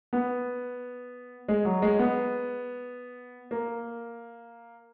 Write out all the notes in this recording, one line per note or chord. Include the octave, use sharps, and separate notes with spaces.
B3
G#3
F#3
G#3
B3
A#3